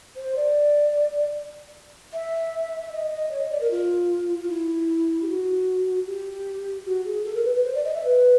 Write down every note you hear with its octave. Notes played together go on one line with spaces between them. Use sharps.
C5
D5
E5
E5
D#5
D#5
C#5
D#5
D5
A#4
F4
F4
E4
G4
F#4
G4
F#4
G#4
A4
A#4
B4
B4
C5
D5
D#5
E5
B4